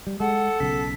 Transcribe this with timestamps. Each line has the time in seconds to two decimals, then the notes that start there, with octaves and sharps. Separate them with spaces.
0.07 G3
0.20 G#3 A4 F#5
0.60 B1 C#3 B6